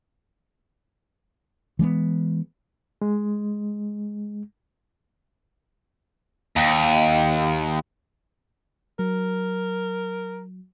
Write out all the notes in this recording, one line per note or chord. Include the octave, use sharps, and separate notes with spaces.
E3 G#3 A3 B3
G#3
D#2
F#3 A#4